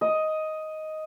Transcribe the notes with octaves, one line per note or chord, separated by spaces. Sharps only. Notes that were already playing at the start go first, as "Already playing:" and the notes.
D#5